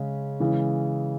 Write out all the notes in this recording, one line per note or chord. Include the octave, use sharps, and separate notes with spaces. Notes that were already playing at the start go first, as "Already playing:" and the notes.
Already playing: C#3 G#3 C#4
C#3 E3 G#3